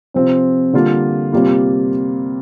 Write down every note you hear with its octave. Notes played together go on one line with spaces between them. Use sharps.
C3 F3 C4
D3 G3 A#3 F4
C3 G3 A#3 F4